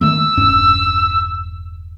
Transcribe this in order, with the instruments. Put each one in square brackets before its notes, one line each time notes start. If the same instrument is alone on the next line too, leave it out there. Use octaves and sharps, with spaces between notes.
[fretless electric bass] D#3 A3 A#3 [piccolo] E6
[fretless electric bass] E1 G2 C#4